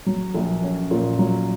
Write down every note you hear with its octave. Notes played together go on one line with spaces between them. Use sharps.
F#3
A#1
C#4
A#2
F#3